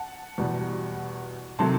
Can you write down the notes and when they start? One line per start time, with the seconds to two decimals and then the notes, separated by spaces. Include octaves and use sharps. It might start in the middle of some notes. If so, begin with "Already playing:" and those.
Already playing: F#5 A5
0.38 E2 B2 G3
1.59 C3 D#3 F#3 A3 A5 C6